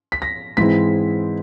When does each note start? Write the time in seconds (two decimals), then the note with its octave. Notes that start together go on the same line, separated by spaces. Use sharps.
0.12 B6
0.22 A#6
0.57 G#2 E3 G#3 C4 E4 B6